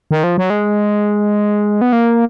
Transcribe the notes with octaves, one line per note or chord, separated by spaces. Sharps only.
D#3
F3
F#3
G#3
B3
A#3